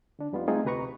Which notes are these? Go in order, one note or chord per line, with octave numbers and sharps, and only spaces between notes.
D3 D4
F2 G3 B3 D#4 F4
A3 C4 D#4 F4 G#4
D2 C3 G4 B4 A#5 C#6